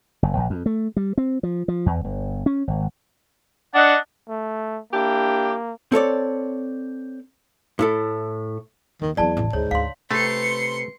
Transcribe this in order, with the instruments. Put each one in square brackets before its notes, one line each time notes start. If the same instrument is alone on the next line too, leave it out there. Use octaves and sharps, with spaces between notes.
[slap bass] F#1
A#1
F2
A3
G3
C4
F3
F3
E2
G1
C#4
G#1
[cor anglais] D4 [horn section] D#5 F#5
[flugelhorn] A3
[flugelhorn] A#3 [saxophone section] D4 E4 G4
[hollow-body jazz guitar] C4 A4 C#5 D5
A2 E4 A4
[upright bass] D#2 [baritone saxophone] D#3
[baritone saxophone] E2 [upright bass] F#3 C4 [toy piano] D5 A5
[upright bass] A1 E3
[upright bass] D2 [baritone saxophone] G#2 [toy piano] C#5
[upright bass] D2 [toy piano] F5 C6
[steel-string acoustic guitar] C3 G4 B4 [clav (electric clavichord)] A3 [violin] C6 C#7